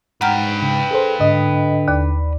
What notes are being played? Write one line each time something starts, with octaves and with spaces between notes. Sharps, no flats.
G#2 B4 F#5 G5 A#5 F6
C#3
G#4 A4 C5
G#2 D3 D#5
D#2 D5